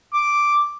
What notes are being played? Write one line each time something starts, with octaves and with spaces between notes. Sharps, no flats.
D6